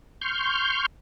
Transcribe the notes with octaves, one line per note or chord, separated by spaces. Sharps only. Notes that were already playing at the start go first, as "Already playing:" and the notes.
C6 C#6 F6 G6